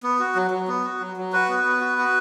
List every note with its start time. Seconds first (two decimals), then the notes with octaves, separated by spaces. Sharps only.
0.03 B3
0.19 F#4
0.35 F#3
0.51 F#3
0.68 B3
0.84 F#4
1.00 F#3
1.17 F#3
1.33 F#4 B4
1.49 B3
1.64 B3
1.81 F#4
1.98 F#4